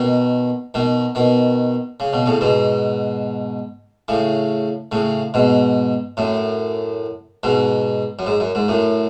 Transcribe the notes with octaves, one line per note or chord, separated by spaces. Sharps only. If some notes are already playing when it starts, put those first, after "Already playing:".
Already playing: B2 D#3
B2 D#3
B2 D#3
C#3
B2
A2 C#3
G#2 B2
A2 C#3
A2 C#3
G#2 B2
F#2 A2
G#2 B2
F#2
G#2
F#2
G#2
F#2 A2